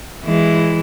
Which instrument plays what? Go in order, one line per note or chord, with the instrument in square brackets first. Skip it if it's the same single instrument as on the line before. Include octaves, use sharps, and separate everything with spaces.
[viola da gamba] E3 G#3 E4